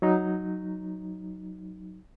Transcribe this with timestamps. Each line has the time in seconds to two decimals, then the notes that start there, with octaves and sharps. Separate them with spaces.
0.02 F#3 D#4